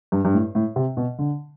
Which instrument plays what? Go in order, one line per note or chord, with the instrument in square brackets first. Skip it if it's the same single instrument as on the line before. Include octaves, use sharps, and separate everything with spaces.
[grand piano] G2
G2
A2
A2
C3
B2
D3